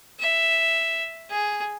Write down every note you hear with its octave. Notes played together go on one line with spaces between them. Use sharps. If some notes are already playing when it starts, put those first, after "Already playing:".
E5
G#4